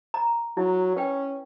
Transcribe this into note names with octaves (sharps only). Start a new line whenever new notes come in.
A#5
F#3 E4
C#4 B4 G5